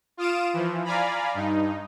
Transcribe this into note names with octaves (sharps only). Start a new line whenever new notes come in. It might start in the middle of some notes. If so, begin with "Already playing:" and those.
F4 F5 D#6 D7 E7
E3 F3
D5 F5 G#5 A#5 B5
G2 D#4